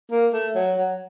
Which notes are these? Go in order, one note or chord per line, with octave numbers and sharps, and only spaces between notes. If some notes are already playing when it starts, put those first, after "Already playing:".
A#3
A3
F#3
F#3